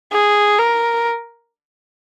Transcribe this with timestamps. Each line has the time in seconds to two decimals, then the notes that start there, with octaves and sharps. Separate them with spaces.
0.12 G#4
0.58 A#4